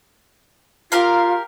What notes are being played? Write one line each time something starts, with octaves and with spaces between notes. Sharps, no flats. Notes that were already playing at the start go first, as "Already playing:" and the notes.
F4 G4 A#4 F5